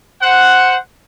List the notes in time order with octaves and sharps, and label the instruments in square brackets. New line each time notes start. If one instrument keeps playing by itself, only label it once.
[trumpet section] C5 F#5